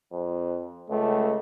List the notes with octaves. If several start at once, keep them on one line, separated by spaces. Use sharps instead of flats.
F2
C#2 A3